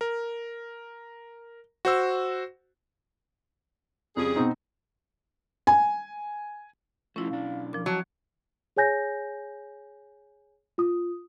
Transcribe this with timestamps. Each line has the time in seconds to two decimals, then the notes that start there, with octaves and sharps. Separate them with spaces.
0.01 A#4
1.85 F#4 C5 E6
4.17 F2 C#3 G3 G#4
4.36 B2 C4 D#4
5.67 G#5
7.16 F3 A3 C#4 E4 F4
7.29 B1 D4 F5
7.73 F3 A#4 D6
7.86 F#3 A5
8.77 G#4 C#5 G#5 G6 A#6
10.78 F4 D#6